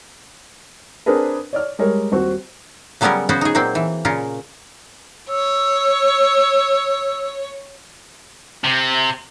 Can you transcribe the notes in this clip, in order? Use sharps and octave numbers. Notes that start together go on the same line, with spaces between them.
C4 D4 G#4 A#4 B4
C#5 D5 F6
G3 G#3 A#4 C#5
D#1 C4 F#4
C#3 F#3 G3 B3 C#4 A#4
C#3 B3 C#4 F#4 C5
D#4 G#4
A#2 F#3 A#3 C4
E3
A#2 C#3 C#4 F4 A#4
C#5 E6
C3